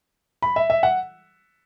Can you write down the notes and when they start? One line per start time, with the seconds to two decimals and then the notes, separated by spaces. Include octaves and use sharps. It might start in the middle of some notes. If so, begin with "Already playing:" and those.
0.42 B5
0.56 E5
0.70 E5
0.83 F#5